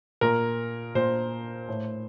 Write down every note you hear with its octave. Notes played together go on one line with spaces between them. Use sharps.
A#2 A#4
A#2 C5
A2